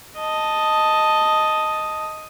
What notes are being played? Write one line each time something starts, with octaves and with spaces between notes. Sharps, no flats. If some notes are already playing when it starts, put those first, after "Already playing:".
D#5 A5